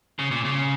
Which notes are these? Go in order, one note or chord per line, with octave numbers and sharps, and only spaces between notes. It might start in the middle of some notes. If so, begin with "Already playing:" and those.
C#3
A#2
C#3